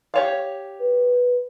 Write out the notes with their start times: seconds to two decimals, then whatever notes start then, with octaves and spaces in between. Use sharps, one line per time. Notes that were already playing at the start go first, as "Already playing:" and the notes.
0.14 G4 C#5 F5
0.80 B4